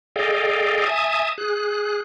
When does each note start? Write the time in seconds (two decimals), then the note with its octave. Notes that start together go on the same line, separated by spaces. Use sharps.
0.16 G#4 A4 D5 D#5 F5 G5
0.86 E5 G#5 A5 D#6
1.38 G#4 F#6